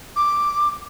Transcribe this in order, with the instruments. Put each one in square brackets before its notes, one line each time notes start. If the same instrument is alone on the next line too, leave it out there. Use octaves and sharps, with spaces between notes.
[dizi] D6